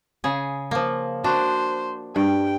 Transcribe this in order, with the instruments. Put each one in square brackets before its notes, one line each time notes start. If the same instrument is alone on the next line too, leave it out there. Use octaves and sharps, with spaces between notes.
[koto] C#3 G#4
F3 A#3
[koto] D4 [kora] F#4 [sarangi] C5
[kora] G2 [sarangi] G5